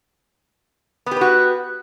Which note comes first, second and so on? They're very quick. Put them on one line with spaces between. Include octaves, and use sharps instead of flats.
B3 G4 B4 F#4